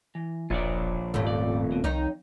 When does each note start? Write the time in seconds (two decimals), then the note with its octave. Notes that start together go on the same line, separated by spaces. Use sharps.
0.15 E3
0.50 E1 A#1 F4 C#5 D5
1.14 D#1 F2 G#2 C#3 A3
1.27 D5
1.72 B2
1.84 C2 F2 D#3 D#4 C#5